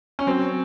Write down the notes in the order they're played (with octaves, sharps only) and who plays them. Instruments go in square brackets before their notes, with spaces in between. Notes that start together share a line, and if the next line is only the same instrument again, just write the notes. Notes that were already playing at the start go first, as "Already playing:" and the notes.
[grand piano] C#4
F#3 C4